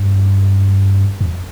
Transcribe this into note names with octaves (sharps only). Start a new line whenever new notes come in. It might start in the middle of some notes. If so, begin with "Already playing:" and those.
Already playing: G2
F2